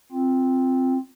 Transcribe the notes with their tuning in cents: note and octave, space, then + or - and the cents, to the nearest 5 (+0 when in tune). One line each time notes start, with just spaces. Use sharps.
C4 +0 F4 +0